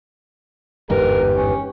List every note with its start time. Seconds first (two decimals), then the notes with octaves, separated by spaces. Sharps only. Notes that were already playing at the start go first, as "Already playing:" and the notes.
0.90 G1 E2 G#2 G4 A#4 B4
1.36 C#4